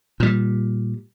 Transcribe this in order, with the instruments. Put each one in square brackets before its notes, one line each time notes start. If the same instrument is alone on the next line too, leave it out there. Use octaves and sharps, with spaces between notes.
[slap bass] A#2 G3